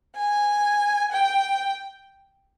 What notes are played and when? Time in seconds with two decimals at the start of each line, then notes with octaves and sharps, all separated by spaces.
0.16 G#5
1.12 G5